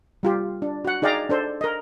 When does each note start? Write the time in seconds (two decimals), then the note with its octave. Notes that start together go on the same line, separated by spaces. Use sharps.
0.23 G3 F4 G4
0.62 D4
0.85 F#4 F#5
1.02 D#4 G#4 D5 F5 G5 A#5
1.30 D4 A4 C5
1.61 A#4 D#5